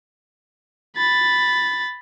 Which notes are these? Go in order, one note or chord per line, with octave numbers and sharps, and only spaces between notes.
B5 A6